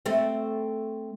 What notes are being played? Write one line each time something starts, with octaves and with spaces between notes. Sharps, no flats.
A3 C4